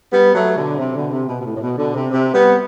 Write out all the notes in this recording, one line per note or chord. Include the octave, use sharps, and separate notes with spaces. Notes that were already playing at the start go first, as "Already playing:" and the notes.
G3 B3
F#3 A3
B2 D3
C3
B2 D3
C3
B2
B2
A2
A2
B2
B2 D3
C3
C3
G3 B3